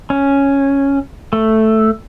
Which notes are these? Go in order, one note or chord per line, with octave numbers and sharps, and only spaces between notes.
C#4
A3